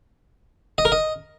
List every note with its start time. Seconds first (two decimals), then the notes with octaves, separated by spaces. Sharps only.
0.78 D#5
0.85 A#4
0.92 D#5